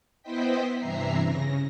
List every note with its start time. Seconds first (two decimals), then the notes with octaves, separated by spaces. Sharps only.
0.23 B3 E4 C5 D#5 G5 B6
0.79 G2 C3 E3 E5 A#5 C7
1.20 C#3 A#6